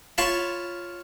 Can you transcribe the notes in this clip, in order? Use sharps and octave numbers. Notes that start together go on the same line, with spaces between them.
F4 C#5 F5 A5 B5